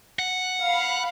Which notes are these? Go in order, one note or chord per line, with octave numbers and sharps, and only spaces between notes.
F#5
F5 B5